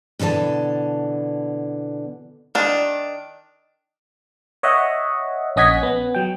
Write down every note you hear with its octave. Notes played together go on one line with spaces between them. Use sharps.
B2 D3 E3 C#5 A5
D#3 D4
C#5 D#5 E5 F#5
A#1 C#4 D#5 F#5 G#6 B6
B3
F#3 G5